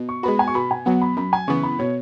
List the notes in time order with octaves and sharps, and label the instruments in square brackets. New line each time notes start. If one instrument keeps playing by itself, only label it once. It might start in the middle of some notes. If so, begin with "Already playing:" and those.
Already playing: [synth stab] B2
[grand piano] C#6
[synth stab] G#3 B3 F#4 [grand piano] B5
[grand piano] G#5
C#6
[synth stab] B2 [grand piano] B5
[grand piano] G#5
[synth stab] F#3 B3 [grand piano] F#5
[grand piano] B5
[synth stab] F#2 [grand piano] B5
[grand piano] G#5
[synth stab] C#3 E3 B3 [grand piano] C#6
[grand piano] B5
[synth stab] B2 [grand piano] C#5